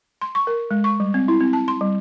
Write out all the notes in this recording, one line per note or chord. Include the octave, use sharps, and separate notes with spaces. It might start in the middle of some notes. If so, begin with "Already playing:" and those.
C6
C#6
A#4
G#3
C#6
G3
C4
E4
C4
A5
C6
G3